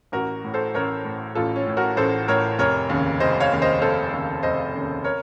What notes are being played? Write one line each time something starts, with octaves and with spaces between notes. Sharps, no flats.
A1 F#4 A#4
A2
A4 C5
A1 A#4 C#5
A2
A1 F4 A4
C#4
A2
F#4 A#4
A1 A4 C5
A2 A#4 C#5
F1 A#4 C#5
D#2 C#3
F1 C5 D#5
C#5 F5
D#2 C#3
C5 D#5
F1 A4 C5
D#2 C#3
F1 C5 D#5
D#2 C#3
A#4 C#5